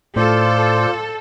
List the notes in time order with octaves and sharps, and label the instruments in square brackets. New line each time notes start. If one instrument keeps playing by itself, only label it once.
[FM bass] A2 [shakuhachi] F4 [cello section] A4 [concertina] C5 D5